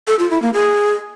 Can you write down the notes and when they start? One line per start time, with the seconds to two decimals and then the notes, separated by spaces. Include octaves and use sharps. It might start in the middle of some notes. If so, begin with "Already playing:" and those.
0.08 A4
0.19 F4
0.31 E4
0.42 A#3
0.54 G#4